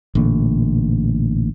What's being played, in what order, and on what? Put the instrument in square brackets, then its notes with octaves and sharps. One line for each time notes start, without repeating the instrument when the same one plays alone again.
[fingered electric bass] A1 A#2 D3